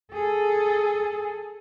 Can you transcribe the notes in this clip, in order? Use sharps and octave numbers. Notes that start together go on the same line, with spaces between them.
G#4 A4